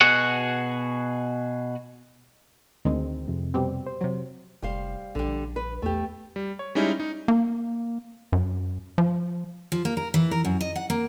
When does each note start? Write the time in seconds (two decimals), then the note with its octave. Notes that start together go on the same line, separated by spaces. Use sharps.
0.01 B2 F#4 G#4 F#5
2.85 D2 D#3 G#3 C4
3.28 F2 C3
3.54 B2 G3 C4
3.87 C5
4.01 C3 F#3
4.62 F1 G3 C5 F5
5.15 A#1 D3 G3
5.56 B4
5.82 E2 A3 G4
6.36 G3
6.59 C#5
6.75 G3 G#3 C#4 D#4 E4
7.00 D#4
7.28 A#3
8.32 F#2
8.98 F3
9.72 F3
9.85 A#3
9.97 A#4
10.14 E3
10.31 A#4
10.45 F#2
10.61 D#5
10.76 F#5
10.90 A#3